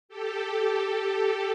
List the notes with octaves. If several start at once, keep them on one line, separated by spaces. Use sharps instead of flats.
G4 A4